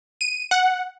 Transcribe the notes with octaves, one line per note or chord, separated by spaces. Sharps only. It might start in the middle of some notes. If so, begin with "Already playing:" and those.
D#7
F#5